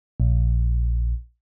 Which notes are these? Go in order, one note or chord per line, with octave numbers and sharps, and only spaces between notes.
A#1